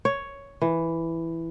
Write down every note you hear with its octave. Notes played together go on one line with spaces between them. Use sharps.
C#5
E3